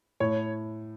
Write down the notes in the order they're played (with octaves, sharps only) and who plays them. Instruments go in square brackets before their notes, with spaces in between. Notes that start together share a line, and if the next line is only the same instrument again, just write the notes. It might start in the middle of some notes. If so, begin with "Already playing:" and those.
[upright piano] A2 [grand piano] C#5